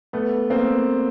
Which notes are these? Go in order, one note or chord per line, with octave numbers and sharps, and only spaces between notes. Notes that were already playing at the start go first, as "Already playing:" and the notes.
A3 B3
A#3 C4